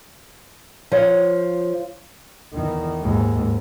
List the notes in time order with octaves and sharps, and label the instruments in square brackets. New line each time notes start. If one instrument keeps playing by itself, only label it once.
[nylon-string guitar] F3 C#5
[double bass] E2 D#3
D#2 G#2